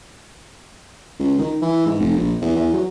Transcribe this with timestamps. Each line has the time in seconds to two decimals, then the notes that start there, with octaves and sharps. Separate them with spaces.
1.20 C#2
1.39 D#3
1.62 E3
1.86 G#2
2.00 F1
2.16 A#1
2.42 E2
2.56 E2
2.74 F#3